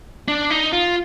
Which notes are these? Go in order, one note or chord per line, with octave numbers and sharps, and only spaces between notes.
D4
D#4
F4